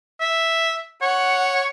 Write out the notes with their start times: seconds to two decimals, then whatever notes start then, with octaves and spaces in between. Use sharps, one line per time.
0.20 E5
1.02 C#5 F#5